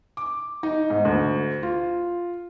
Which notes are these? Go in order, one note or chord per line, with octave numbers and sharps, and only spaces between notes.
D6
D#4
G#2
D2
F4